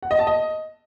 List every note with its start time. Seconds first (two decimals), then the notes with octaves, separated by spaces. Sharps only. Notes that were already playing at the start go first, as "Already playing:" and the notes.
0.03 F#5
0.11 D#5
0.19 A5
0.27 D#5